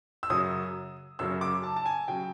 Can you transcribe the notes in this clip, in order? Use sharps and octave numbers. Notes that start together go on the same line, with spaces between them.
E6
F#2 C#3 F#3 D#6
F#2 C#3 F#3 E6
D6
A5
A5
G#5
C#3 F#3 G5